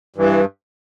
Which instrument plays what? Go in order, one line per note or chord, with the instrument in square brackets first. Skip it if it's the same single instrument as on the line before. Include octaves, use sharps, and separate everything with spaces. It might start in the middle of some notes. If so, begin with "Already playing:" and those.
[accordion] G2 E3